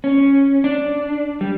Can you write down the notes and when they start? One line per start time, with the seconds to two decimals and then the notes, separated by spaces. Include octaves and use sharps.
0.04 C#4
0.64 D4
1.41 G3